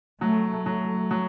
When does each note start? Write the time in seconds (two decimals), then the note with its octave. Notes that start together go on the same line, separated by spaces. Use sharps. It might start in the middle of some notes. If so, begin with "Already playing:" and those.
0.21 F#3 A3
0.66 F#3 A3
1.11 F#3